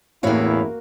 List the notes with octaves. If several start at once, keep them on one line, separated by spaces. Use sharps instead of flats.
A1 E2 A2 A#3 E4 F#4 C#5 F5